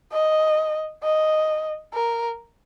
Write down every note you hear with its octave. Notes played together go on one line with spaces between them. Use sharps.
D#5
D#5
A#4